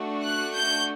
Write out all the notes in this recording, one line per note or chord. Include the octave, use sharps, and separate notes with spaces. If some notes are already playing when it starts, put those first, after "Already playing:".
Already playing: A3 D4 F#4
F#6
G6